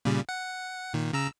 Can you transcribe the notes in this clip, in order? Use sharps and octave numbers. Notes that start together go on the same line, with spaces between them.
A#2 C#3 G3
F#5
A#2 D#3
C#3 A#5 E6